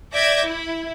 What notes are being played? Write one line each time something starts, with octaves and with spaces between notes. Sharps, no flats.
D5 E5 D6 G6 G#6 A#6
E4